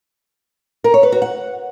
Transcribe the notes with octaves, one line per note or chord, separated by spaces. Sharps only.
A#4
C#5
B4
F#4
F#5